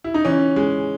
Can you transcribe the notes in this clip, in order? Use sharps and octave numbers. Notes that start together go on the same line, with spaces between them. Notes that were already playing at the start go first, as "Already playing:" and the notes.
E4
D#4
E3 C#4
G#3